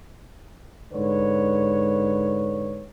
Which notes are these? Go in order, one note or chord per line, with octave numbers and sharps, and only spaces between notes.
G#2 D3 B4 C#5